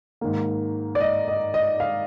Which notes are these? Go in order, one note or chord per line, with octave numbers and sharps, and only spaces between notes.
G#2 D#3 A#3
D5
D#5
D#5
D#5
F5